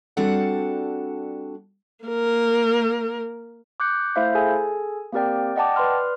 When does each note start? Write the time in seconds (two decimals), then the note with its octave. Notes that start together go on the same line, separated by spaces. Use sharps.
0.17 G3 C4 D4 F#4 A4 F#5
2.05 A#3 A#4
3.80 D6 F#6 G6 C#7
4.15 A3 E4 C5 E5 F5 G6
4.35 G#4 A4 G#5
5.12 A#3 C4 G4 A#4 D5 G5
5.56 D5 D#5 F#5 G5 A5 D6
5.76 B4 D5 C6 F6